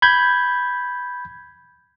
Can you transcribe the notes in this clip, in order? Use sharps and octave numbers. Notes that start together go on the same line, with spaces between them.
B5 G6 G#6